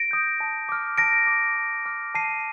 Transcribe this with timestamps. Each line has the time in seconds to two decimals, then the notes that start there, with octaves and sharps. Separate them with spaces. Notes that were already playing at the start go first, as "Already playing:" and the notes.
Already playing: A#6 D7
0.11 D#6 G6
0.40 A5
0.69 D6 F6
0.98 A5 A#6 D7
1.27 D6 F6
1.56 A5
1.85 D6 F6
2.15 A5 C7 D#7